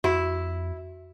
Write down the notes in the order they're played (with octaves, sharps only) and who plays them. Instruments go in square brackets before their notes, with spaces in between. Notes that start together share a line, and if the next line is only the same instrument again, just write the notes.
[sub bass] F2 [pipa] E4 [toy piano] F#4